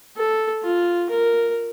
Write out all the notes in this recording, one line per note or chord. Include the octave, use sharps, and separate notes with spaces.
A4
F4
A#4